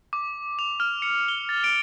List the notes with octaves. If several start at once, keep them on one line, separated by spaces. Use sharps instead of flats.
D6
F7
F6
C#7
G7
A6
D7